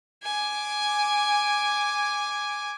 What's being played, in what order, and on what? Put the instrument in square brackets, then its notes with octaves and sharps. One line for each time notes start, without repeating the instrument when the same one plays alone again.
[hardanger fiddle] G#5 D6